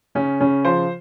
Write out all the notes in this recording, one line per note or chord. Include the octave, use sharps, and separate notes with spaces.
C#3 C#4
C#3 C#4
F3 C5